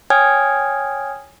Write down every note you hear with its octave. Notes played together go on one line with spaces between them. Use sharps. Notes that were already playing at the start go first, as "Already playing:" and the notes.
C#5 G5 G#5 D#6 F6 G#6